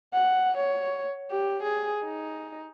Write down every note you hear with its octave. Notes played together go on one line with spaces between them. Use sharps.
F#5
C#5
G4
G#4
D#4